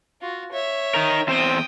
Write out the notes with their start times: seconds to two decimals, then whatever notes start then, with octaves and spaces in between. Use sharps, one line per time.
0.21 F4 F#4
0.52 C#5 E5
0.94 D#4 A#4
1.28 E2 C4 C5 G5 D#6